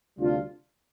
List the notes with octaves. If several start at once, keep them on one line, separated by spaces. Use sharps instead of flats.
D2 C3 G3 D4 F4